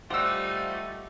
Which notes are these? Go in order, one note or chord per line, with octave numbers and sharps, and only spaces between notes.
G3 A3 D#4 F4 G4 C5 F#5 E6